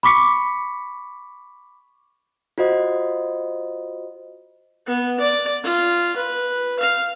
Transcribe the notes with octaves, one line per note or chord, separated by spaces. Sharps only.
B5 C#6 D6 B6 C#7
F4 F#4 C5 D#5
B3
D5
F4
B4
F5